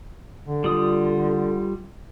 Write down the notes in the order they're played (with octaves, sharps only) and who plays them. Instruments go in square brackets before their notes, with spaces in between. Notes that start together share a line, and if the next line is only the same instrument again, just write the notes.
[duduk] D3
[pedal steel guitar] G3 F4 D#6